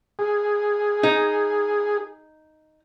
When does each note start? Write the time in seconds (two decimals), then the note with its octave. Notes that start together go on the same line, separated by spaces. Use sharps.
0.19 G#4
1.03 D#4